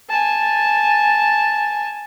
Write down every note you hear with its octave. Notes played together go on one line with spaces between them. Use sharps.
G#5 A5